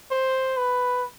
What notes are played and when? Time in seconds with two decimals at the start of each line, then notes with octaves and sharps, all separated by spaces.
0.11 C5
0.57 B4